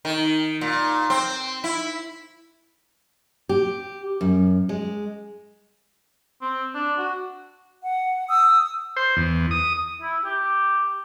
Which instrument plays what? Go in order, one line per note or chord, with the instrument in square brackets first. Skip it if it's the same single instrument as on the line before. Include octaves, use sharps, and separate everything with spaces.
[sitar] D#3
A#2
C4
E4
[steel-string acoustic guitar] G4
F#2
G#3
[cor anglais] C4
D4
F#4
[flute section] F#5
D#6 E6
[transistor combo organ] C5
E2
D#6
[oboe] E4
G4